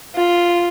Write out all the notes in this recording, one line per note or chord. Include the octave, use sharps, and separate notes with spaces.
F4